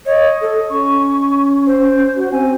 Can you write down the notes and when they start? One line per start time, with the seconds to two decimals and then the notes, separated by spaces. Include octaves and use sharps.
0.06 C#5 D#5
0.42 A4
0.70 C#4 C#6
1.67 C5
2.16 F#4
2.32 C4 G#5